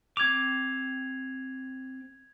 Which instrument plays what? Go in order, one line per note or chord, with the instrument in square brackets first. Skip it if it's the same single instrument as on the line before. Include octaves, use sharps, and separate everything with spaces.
[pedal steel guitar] C4 D6 [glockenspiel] G#6 F7